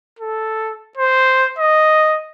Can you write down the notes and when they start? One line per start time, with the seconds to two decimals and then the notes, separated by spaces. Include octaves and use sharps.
0.19 A4
0.97 C5
1.58 D#5